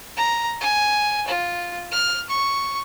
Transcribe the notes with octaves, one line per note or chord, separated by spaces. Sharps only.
A#5
G#5
F4
F6
C#6